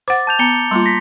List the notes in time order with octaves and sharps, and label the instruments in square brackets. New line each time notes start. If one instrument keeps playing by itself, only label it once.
[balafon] C5 F#5 [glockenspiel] D6 A6
[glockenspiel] A5 G6 F7
[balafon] B3 [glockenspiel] A#5 C#7 G7
[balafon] G3 A#3 F4 [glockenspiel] C6
[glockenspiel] A#6 B6